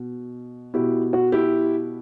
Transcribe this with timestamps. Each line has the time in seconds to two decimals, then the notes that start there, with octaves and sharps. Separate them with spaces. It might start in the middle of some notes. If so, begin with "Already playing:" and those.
Already playing: B2
0.74 B2 E4 G4
1.13 F#4
1.32 E4 G4